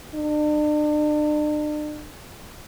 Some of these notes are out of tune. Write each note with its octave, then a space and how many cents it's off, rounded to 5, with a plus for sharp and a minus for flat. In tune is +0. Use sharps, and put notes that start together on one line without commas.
D4 +40